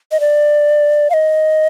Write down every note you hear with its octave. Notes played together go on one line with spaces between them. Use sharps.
D#5
D5
F5
D#5